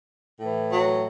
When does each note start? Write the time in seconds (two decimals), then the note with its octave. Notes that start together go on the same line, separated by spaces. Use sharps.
0.39 A2 E3
0.71 F#3